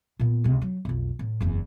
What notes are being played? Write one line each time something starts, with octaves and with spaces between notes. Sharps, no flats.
A#2 B3
C#2 C3
F#3
B1 F2
A2
F#1 E2